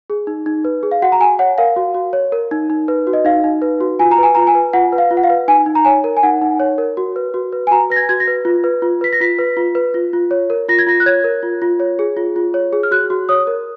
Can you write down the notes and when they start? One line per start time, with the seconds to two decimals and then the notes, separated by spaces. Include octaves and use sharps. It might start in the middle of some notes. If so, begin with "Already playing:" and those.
0.10 G#4
0.27 D#4
0.46 D#4
0.65 B4
0.83 G#4
0.91 F5
1.02 F#4 F#5
1.12 A#5
1.20 F#4 G#5
1.39 C#5 F#5
1.58 A#4 F5
1.76 F#4
1.94 F#4
2.13 C#5
2.32 A#4
2.51 D#4
2.70 D#4
2.88 B4
3.07 F#4
3.13 D#5
3.25 D#4 F5
3.44 D#4
3.62 B4
3.81 F#4
3.99 F4 G#5
4.11 A#5
4.18 B4 G#5
4.35 F4 A#5
4.47 G#5
4.55 B4
4.73 F4 F#5
4.93 B4
4.98 F5
5.11 F4
5.17 F#5
5.23 F5
5.30 B4
5.48 D#4 G#5
5.66 D#4
5.75 A#5
5.85 C#5 G#5
6.04 A#4
6.17 G#5
6.23 D#4 F#5
6.42 D#4
6.60 C#5
6.78 A#4
6.97 F#4
7.16 B4
7.34 F#4
7.52 B4
7.67 G#5
7.71 F#4 A#5
7.90 B4 A#6
7.96 G#6
8.09 F#4 G#6
8.20 A#6
8.28 B4
8.45 F4
8.64 B4
8.82 F4
9.01 B4 B6
9.13 A#6
9.20 F4 B6
9.39 B4
9.57 F4
9.75 B4
9.94 F4
10.13 F4
10.31 C#5
10.50 A#4
10.68 F4 A#6
10.79 G#6
10.87 F4 A#6
11.00 F#6
11.06 C#5 G#6
11.24 A#4
11.43 F4
11.62 F4
11.80 C#5
11.99 G#4
12.17 F4
12.36 F4
12.54 C#5
12.73 G#4
12.83 F6
12.91 F#4 F#6
13.10 F#4
13.29 C#5 D#6
13.47 A#4